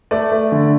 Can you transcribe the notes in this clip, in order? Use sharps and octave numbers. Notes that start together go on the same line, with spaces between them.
A3 D5
A3
D3